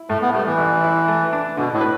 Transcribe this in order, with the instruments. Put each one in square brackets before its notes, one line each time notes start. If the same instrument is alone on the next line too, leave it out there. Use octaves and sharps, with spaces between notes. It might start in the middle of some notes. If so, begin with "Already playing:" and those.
Already playing: [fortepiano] E4
[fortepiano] A2 [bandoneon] A3
[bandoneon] B3
[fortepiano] G3 [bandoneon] A3
[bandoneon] E3
[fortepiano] A1
E4
A3
D4
[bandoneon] B2 [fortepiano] D3
[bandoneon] A2
[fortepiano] B4